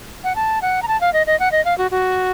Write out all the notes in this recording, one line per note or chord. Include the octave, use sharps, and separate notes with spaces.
F#5
A5
F#5
A#5
A5
F5
D#5
D#5
F#5
D#5
F5
F#4
F#4